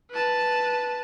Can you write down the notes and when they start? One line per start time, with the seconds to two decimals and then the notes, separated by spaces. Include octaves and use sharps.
0.11 B4 A5